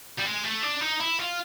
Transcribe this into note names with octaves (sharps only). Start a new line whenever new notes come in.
G3
G#3
A3
D4
D#4
E4
F4